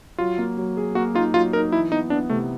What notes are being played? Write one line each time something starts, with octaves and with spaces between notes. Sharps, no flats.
F#3 F4
A#3
F#3
G#4
A#3 F#4
D#4 F4
F#3 F4
D#4 A#4
E3 E4
B3 D#4
B3 D4
C3 A3